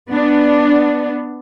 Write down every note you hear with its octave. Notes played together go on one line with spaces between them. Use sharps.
B3 D4